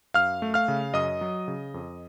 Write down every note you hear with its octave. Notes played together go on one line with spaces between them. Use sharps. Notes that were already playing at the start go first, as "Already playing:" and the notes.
F#2 F5 F6
A3
F5 F6
C#3
F#2 D#5 D#6
F#3
C#3
F2